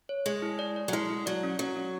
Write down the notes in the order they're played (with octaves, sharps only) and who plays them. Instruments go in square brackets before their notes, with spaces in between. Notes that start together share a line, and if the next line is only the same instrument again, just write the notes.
[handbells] C#5
[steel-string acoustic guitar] G#3 [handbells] G#4
[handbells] E4
D5
D5
[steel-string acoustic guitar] F#3
[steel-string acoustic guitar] G#3 [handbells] E4
[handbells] E4
[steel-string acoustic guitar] F#3 [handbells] D5
[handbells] C#4
[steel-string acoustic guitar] F#3 [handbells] C#4
[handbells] C#4